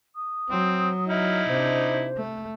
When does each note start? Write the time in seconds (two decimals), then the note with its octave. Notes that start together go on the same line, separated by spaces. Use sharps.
0.15 D#6
0.50 F#3 C4
1.08 D#4 E4 F6
1.48 C3 D4 C5
2.17 A3